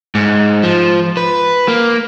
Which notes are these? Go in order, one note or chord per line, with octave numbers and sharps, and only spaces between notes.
G#2
F3
B4
A#3